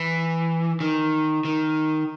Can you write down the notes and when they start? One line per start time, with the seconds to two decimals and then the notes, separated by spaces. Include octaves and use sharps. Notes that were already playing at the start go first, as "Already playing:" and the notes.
Already playing: E3
0.80 D#3
1.45 D#3